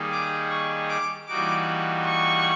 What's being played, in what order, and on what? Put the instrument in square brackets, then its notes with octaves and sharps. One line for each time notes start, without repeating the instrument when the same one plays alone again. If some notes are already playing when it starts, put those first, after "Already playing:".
Already playing: [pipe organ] D#3 G3 A#3 D#4 G#4
[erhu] D6
C#6
D6
[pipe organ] E3 G3 A#3 D#4 F#4 [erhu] D6
[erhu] C#6